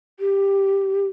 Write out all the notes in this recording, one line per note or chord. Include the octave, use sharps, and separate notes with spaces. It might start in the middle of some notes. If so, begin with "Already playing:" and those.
G4